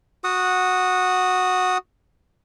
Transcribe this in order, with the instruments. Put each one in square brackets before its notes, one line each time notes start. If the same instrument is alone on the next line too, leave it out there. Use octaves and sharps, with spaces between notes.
[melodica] F#4 F#5 D#6